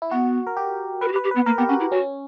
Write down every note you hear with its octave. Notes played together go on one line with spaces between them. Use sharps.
E4
B3 F#4
A#4
G4
A#4 B4
F#4
G4
B4
G4
B3 B4
A#3 A#4
B3 G4
C#4 F#4
E4
C#4 F#4